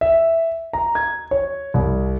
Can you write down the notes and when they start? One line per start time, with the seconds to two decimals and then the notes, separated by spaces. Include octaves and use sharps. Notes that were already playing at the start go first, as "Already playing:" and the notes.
0.01 E5
0.73 A#5
0.95 G#6
1.31 C#5
1.74 C2